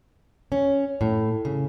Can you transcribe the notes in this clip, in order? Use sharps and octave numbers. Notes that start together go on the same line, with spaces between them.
C#4
A2
C#3